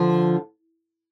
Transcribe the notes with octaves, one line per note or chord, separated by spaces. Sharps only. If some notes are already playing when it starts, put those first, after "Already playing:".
Already playing: D3 F3